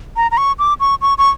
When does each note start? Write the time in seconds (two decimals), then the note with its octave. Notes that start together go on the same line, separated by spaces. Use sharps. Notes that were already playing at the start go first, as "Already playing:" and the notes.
0.16 A#5
0.31 A#5
0.37 C#6
0.59 D6
0.80 C#6
1.02 C#6
1.18 C#6